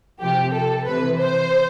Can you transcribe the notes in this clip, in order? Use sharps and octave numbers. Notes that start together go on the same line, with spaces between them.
C3 F3 G4
A4
C3 E3 B4
C5